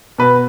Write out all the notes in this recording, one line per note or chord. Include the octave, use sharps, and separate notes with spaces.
B2 B4